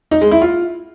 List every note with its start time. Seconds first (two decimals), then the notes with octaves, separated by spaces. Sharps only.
0.11 D#4
0.21 G#3
0.31 E4
0.41 F4